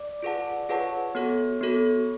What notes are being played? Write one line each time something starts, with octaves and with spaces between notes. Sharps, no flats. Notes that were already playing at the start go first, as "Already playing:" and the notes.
Already playing: D5
F4 G#4 B4 F#5 A5
F4 G#4 B4 C#5 F#5 A5
B3 F#4 A4 C#5
B3 F#4 A4